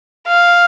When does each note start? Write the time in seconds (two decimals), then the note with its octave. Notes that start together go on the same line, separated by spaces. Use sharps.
0.27 F5